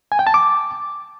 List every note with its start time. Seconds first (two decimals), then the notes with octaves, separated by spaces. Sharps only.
0.12 G#5
0.19 G5
0.27 A5
0.34 D6